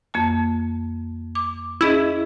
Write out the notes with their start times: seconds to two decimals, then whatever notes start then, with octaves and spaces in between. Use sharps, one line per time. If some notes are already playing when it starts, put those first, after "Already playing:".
0.14 F2 A#3 A5
1.35 D6
1.81 C#4 E4 G#4 D#5